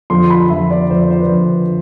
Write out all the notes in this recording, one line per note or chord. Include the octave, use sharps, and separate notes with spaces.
F2 D3 F3 C6
B5
F2 D3 F3 E5
D5
F2 D3 F3 C5
D5
C5
B4
F2 D3 F3